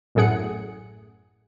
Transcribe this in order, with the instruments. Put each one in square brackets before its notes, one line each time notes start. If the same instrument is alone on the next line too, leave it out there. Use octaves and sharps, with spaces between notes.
[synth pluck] A1 F#2 A2 G#4 F#5 C#7